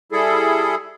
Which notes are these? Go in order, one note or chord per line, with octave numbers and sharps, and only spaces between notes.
G3 E4 G#4 A4